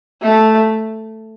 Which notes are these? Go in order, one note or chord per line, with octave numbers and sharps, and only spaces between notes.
A3